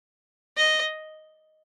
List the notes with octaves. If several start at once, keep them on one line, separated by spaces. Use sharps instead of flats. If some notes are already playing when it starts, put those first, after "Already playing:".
D#5